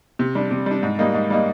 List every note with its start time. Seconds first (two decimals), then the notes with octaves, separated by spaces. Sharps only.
0.19 C3
0.35 G3 D4
0.51 C3
0.66 G3 D4
0.83 G#2
0.99 G3 A#3 D#4
1.14 G#2
1.30 G3 A#3 D#4